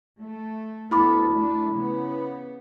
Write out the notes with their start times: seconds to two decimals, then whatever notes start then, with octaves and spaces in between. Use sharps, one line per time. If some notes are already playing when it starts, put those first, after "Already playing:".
0.20 A3
0.91 D2 B3 E4 A4 B5 D6
1.31 A3 D4
1.71 C#3 B3